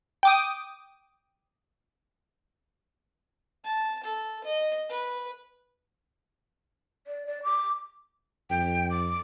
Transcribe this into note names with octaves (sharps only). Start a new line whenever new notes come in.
G5 D6 D#6
A5
A4
D#5
B4
D5
D5
D6
F2 G5
D6